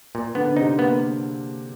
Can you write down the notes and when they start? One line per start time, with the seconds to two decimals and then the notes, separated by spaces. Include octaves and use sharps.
0.15 A#2
0.35 D3 B3 D4
0.56 C3 C4 D#4
0.78 A#3 B3